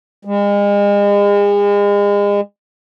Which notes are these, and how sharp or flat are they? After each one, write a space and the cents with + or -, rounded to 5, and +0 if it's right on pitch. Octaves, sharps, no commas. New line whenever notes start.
G#3 -40